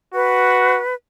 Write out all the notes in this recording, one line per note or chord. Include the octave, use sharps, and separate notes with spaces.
F#4 B4